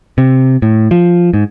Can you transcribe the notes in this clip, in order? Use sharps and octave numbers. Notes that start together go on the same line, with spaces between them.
C3
A2
F3
G#2